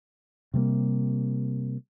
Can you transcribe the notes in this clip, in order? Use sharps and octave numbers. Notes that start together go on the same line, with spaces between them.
C3 G3 A3 A#3